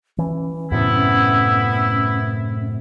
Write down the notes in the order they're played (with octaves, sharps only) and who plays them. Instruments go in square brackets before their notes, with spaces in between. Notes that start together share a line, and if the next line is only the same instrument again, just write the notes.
[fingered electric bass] E3 [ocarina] C#4
[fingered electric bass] F#2 A2 C3 [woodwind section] B3 E4